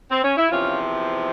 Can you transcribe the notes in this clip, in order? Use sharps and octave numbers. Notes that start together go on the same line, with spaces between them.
C4
C#4
E4
E2 C3 F3 C#4 F4